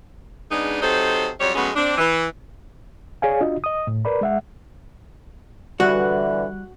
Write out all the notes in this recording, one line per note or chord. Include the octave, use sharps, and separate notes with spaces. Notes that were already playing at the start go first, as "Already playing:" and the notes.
C#3 G#3 B3 D4 D#4
C3 F#3 D#4 A4 C5
F2 F#3 G3 C#5
A2 F#3 G#3 B3 C#4
C4 D4
E3
G#4 C#5 D5 F5 G#5
D4 F4 F#4 D#5
D#5 D#6
A2
A#4 B4 D5 B5
G#3 E5 F#5
D3 E3 G3 F#4 F#6